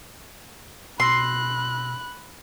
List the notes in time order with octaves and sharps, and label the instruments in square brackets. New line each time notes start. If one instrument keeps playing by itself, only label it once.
[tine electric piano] B2 E6 A#6 [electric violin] B5 F#6 [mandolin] C6